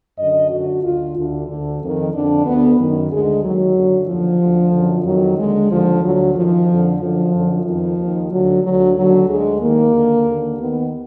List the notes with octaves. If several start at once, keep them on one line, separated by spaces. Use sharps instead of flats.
F#2 D3 D#5
F#2 D3 F#4
D2 D3 F4
D2 D3
D2 D3
F2 D#3
F2 D3 D4
D2 D3 B3
F#2 D#3
D2 D3 G#3
D#2 D#3 F#3
F#2 D3
D#2 D3 F3
D2 D3
F#2 D3
F2 D#3 F#3
D#2 D3 G#3
D#2 D3 F3
D2 D3 F#3
F#2 D#3 F3
F2 D3
F#2 D3 F3
F#2 D3
F2 D#3 F3
D#2 D#3
D2 D3 F#3
D2 D3 F#3
D#2 D3 F#3
D2 D3 G#3
D#2 D#3 A#3
D#2 D3
D#2 D3
D#2 D#3 B3